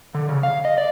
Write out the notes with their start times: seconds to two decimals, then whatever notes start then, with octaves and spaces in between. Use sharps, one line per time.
0.14 D3
0.29 C#3
0.43 F5
0.65 D#5
0.78 D5